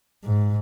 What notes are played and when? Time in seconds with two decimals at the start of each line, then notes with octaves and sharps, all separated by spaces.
0.24 G#2